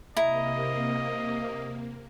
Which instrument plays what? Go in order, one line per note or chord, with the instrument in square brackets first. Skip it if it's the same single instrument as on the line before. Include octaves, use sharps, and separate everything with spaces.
[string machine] C3 A#3 [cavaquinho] E4 A#5 [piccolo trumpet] D#5